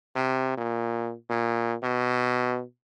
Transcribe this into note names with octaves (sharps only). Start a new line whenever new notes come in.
C3
A#2
A#2
B2